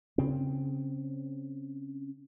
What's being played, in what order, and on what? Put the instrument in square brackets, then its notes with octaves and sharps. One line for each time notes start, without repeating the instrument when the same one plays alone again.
[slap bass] C#3 C4